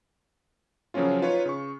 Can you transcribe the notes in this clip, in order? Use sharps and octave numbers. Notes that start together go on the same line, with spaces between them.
C#3 F3 F#3 A#3 C#4 F4
D#4 F4 B4 C#5
C#3 C#6